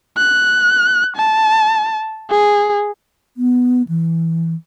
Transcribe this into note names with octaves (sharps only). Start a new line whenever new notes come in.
F#6
A5
G#4
B3
E3